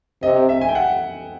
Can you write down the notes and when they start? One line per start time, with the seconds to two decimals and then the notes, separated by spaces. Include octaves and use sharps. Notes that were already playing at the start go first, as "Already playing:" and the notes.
0.22 C3 D#5
0.49 E5
0.61 G#5
0.69 G5
0.75 F#5